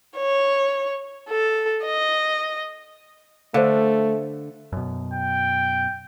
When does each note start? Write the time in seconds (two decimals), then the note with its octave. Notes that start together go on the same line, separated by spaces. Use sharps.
0.17 C#5
1.29 A4
1.85 D#5
3.54 D3 A3 C5 F5
4.73 F#2 B2
5.13 G5